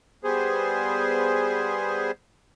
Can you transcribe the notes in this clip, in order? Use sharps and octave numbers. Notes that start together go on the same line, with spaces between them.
G3 B3 G#4 C5